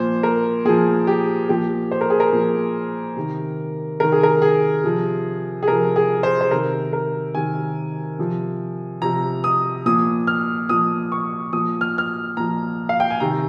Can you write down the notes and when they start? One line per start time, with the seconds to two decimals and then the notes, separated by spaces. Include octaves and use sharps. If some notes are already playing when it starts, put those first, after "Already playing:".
Already playing: A#2 F3 C5
0.23 A#4
0.65 A#2 F3 G#4
1.07 G4
1.49 A#2 F3 G4
1.91 C5
2.01 A#4
2.10 G#4
2.20 A#4
2.33 A#2 F3
3.16 C3 D#3
4.00 C3 D#3 A#4
4.12 G#4
4.23 A#4
4.42 G#4
4.84 C3 F3
5.63 G#4
5.68 C3 F3 A#4
5.96 G#4
6.23 C5
6.41 C5
6.51 C3 D#3 A#4
6.93 A#4
7.35 C3 D#3 G#5
8.19 C3 F3
9.02 C3 F3 A#5
9.44 D#6
9.86 A#2 F3 D#6
10.27 F6
10.69 A#2 F3 D#6
11.12 C#6
11.53 A#2 F3 D#6
11.81 F6
11.98 F6
12.37 A#2 F3 A#5
12.89 F5
13.00 G5
13.10 G#5
13.20 C3 D#3 A#5